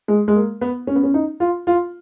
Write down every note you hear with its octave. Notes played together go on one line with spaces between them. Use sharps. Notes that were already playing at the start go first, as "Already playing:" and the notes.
G#3
G#3
A#3
B3
C#4
B3
C#4
D#4
F4
F4